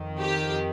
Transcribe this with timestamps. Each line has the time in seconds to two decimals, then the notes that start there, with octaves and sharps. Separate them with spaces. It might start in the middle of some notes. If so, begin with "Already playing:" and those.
Already playing: F2 D#3
0.20 G4